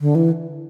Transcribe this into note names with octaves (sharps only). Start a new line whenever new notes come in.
D3
E3